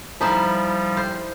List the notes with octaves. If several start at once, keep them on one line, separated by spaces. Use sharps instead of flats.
F3 G3 D#4 E4 C5 E5 A#5 D#6
C5